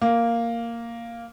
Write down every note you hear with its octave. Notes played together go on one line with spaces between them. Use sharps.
A#3